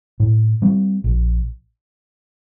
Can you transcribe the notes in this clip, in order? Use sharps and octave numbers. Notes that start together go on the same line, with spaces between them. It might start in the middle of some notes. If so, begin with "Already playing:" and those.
A2
G3 C4
A#1